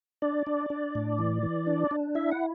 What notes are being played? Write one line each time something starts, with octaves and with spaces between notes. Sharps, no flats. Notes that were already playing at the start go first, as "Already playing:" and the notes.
D4 D5
D4
D4
A2
E3
E3
D4
D4
E4 E5
F#5